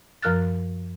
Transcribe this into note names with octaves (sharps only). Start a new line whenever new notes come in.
F#2 F3 A#4 F6 F#6 A6